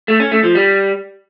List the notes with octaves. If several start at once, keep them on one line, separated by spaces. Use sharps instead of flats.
A3
C#4
A3
F3
G3